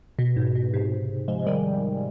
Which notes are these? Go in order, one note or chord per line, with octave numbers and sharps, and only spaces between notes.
B2
G#2
B2
G#2 C3
F3 G#3
G#3
D#3 G3